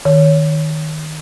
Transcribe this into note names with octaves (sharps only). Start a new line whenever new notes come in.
D#3